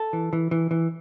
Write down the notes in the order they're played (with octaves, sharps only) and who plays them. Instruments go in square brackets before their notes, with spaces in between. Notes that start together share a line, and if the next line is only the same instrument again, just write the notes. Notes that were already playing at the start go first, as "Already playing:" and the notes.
Already playing: [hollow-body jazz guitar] A4
E3
E3
E3
E3